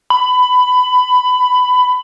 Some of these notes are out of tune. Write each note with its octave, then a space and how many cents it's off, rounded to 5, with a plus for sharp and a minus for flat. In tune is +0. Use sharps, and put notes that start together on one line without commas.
B5 +15